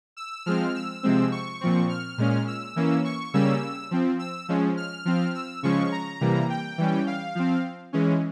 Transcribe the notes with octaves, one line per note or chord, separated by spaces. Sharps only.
E6
F3 G#3 C4 F6
E6
C3 F3 G#3 C4
C#6
A#2 F3 C4
F6
A#2 G#3 C#4
E6
E3 A#3 C#4
C#6
C#3 G3 A#3 C#4 E6
F3 C4
E6
F3 G#3 C#4
F6
F3 C4
E6
C#3 F3 G#3 C#4 C#6
A#5
C3 E3 G3 A#3
G5
E3 G3 C#4
F5
F3 C4
E3 G#3 C#4